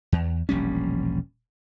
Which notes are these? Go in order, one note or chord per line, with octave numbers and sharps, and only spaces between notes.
E2
E1 A#1 G3 C#4